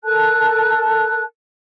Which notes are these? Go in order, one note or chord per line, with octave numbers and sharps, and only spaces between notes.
A4 A#4 A5 F#6